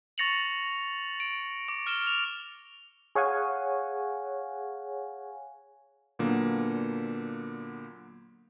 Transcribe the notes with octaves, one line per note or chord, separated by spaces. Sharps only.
C#6 A6 A#6 C#7 F7 F#7
D7
D6
F6 D7 E7 G7
F7
G#4 C#5 F5 F#5 G#5
A#2 D3 F#3 A#3 B3